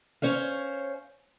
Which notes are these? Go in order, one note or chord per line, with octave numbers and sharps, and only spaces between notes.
C#4 C5 C#5 F5